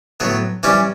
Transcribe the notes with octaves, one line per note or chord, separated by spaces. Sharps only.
A2 F#3 B3
E3 G3 C#4 G4